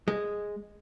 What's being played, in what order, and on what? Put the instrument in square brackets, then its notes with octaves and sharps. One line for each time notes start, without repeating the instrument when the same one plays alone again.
[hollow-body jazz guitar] G#3